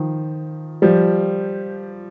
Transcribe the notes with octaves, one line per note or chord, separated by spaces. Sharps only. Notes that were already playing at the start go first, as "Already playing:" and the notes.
Already playing: D#3 F3
F3 G3